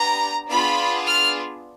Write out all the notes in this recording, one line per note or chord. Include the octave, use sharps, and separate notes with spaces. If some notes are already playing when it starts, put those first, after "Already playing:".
Already playing: B3 D4 G4 A#5
B3 D4 F4 G#4 B5
F6